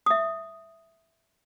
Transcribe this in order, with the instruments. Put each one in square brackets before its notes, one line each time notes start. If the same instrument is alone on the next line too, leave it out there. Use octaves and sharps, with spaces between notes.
[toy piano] E5 D#6